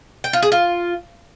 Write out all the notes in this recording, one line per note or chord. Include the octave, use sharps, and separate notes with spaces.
G5
F4
G#4
F4